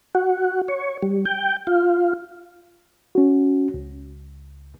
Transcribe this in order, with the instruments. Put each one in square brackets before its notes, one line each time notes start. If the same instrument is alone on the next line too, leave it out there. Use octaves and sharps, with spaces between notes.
[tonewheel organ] F#4
C#5
G3
G5
F4
[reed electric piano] C#4 F#4
C#2